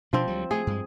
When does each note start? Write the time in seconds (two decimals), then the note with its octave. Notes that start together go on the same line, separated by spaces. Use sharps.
0.13 B2 F3 C4 D4
0.27 D2 F#3 G3
0.51 A3 G#4
0.67 G2 G#3